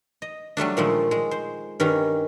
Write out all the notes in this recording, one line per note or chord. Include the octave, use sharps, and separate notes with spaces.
D#5
F#3 G3 A3 D4
A#2 D#3 F3 G#3 A3
G#3
C5
G2 D#3 G3 C#4 A#5